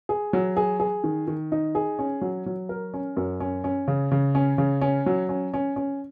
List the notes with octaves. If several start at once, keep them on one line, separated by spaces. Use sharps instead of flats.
G#4
F#3
G#4
G#4
D#3
D#3
D#4
G#4
C#4
F#3
F#3
A#4
C#4
F#2
C#4
C#4
C#3
C#3
C#4
C#3
C#4
F#3
C#4
C#4
C#4